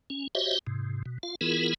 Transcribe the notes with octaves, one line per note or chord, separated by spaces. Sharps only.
C#4
F#4 G4 C5 C#5 D#5 E5
G#2 C3
B2
F4 F5
E3 B3 E4 F4 G#4 A#4